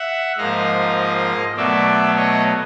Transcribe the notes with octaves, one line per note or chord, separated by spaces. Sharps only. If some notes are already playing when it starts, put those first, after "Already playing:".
Already playing: E5 F#5
G#2 F3 A#3 D#5 F5
B2 F#3 A3 D5 E5
C#5 D#5